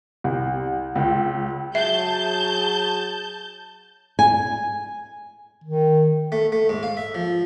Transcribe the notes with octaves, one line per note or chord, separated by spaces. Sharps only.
C2
C#2
F#3 G#4 E5 A5 G6
G#5
D#3
A3
A3
G#2
F5
E5
F3